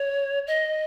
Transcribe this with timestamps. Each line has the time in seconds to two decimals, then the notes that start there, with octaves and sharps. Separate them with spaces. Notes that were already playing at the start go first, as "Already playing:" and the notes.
Already playing: C#5
0.47 D#5